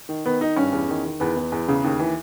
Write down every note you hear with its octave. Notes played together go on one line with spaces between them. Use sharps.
D#3
D#3 B3
D#3 D#4
G2 C#4
E2
D#3
D#3
E2 B3
E2
E2
C#3
D#2
E3